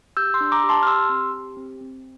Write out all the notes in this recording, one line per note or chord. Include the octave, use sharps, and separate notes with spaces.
G4 E6 G6
C6 E6
D4
A#5 D6
G4
A5 C6
F6
G4 C6 E6
C4
G4
C4
C4